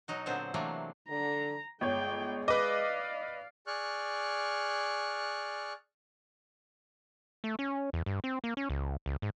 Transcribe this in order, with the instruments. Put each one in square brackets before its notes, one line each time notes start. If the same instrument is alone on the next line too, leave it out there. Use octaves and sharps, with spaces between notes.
[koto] B2 F#3 D#4 F#4
A#2 D3 F#3 B3 C4 C5
C3 E3 F#3 A3 A#3 D4
[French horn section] D3 [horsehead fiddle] A#5
[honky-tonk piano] G1 C#5 [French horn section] G#3 [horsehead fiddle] G5
[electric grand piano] B4 D#5 [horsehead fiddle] D5 F5 [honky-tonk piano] D6 F#6
[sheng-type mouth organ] G#4 D5 C#6 F6 F#6
[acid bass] A3
C#4
E2
G2
C4
A#3
C#4
C#2
C#2
G#2